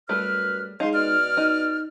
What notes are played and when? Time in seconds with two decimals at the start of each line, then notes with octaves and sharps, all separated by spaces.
0.09 F#2 G3 A3 B4 F6
0.80 G#3 D#4 F5 C6
0.94 B2 D5 F6
1.37 D#4